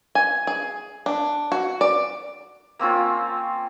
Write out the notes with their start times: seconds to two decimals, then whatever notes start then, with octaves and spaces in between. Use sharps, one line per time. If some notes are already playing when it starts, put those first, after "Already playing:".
0.15 G#5
0.47 G#4
1.06 D4
1.52 F#4
1.81 D5
2.79 A#3 C4 C#4 F4